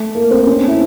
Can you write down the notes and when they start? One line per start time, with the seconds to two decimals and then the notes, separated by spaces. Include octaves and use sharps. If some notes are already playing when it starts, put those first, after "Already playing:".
Already playing: A3
0.15 A#3
0.31 C4
0.47 C#4
0.57 D4
0.68 E4